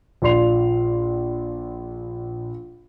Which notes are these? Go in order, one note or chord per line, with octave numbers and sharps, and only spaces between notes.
A#1 F4 D5 C6 C7 F7